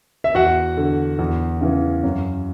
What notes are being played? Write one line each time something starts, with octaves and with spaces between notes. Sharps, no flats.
E5
E2 F#4 F#5
D3
E2
C#3 E3
F#2